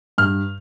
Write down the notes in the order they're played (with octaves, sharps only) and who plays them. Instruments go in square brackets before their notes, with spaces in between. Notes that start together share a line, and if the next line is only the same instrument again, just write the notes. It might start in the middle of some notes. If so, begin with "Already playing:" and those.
[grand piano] G2 F6